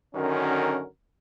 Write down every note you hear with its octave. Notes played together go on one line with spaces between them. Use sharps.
F#2 D3 D#3 C#4 F#4 A#4